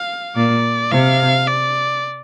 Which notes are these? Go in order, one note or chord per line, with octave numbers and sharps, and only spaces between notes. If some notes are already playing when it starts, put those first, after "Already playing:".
Already playing: F5
A#2 D5
C3 F5
D5